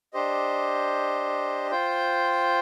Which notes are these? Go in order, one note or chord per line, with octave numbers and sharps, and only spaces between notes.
D4 G4 C5 D#5
F4 C5 G5